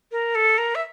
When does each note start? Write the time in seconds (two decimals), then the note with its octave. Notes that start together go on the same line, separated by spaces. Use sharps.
0.12 A#4
0.35 A4
0.58 A#4
0.75 E5